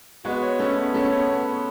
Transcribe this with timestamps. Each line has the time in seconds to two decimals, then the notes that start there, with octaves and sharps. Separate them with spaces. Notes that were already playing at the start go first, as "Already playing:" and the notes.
0.25 G#3 B3 F#4
0.42 C#5
0.59 A3 B3 C#4
0.77 B3
0.94 A3 C#4 C#5
1.11 B3
1.30 B3
1.47 B3